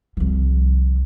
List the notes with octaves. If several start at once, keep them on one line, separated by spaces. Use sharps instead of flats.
C2 F3